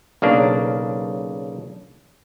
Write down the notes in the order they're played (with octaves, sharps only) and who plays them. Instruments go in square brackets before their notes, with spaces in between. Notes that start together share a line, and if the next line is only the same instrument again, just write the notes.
[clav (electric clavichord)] B1 C#3 A#3 D4